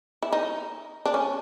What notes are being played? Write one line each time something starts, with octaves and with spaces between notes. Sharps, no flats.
E4
D#4
D4
C#4